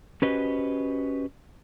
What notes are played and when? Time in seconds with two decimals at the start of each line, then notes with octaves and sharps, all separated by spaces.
0.22 C#4 F#4 G4 B4 C5 D#5